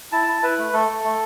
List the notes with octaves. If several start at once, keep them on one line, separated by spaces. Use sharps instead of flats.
E4 A5
E4
E4 B4
A3
A3 A4
A3
A3